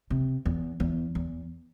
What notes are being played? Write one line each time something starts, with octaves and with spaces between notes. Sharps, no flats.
C3
E2
E2
E2